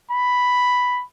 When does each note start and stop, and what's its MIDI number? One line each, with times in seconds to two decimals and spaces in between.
0.12 1.03 83